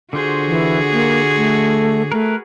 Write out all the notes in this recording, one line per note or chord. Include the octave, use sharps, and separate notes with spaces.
D3 F4 F#4 G#4 C5
E3
A#3
A3
A3 A#4 B4